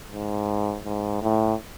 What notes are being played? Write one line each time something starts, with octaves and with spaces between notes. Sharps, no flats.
G#2
G#2
A2